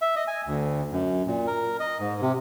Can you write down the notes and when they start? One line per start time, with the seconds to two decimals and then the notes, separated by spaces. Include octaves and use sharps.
0.02 E5
0.16 D#5
0.28 G#5
0.47 D2
0.92 F#2
1.26 A#2
1.47 A#4
1.80 D#5
2.00 G#2
2.22 C3